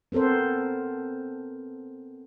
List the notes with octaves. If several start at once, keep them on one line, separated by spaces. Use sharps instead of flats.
B3 C4 A4 A#4 C5